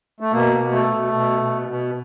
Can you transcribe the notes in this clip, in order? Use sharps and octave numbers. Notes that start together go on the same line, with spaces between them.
A3
B2 A#3
B2
A3
B2
B2
B2
B2